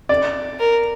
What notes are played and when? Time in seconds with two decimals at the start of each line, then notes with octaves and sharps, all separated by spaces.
0.09 D5
0.60 A#4